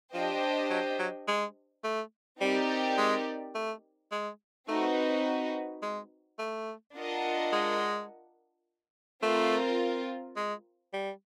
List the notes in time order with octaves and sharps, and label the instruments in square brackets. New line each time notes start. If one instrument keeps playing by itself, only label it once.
[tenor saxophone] F3 [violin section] D4 G4 C5 D#5 G5
[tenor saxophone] F#3
F#3
G#3
A3
[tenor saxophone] G3 [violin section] C4 D#4 G4 A#4 D5
[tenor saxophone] G#3
A3
G#3
[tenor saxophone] A3 [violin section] C4 D#4 F#4 B4
[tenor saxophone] G#3
A3
[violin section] D4 F4 A#4 D#5 F#5
[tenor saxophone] G#3
[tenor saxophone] A3 [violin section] C4 F4 A#4
[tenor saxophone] G#3
G3